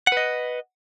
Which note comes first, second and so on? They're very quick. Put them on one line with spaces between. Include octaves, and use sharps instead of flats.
F#5 B4 D#5